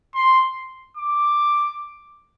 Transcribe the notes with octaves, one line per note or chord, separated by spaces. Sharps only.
C6
D6